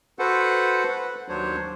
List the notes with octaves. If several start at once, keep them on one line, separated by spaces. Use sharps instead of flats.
F#4 A4 B4 C5 F#5
B4 F#5
D#2 F#3 D4 C5 C#5